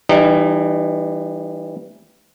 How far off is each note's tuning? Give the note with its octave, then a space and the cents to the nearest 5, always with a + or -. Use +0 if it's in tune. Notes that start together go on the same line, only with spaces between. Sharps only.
E3 +0 G3 +0 D#4 -35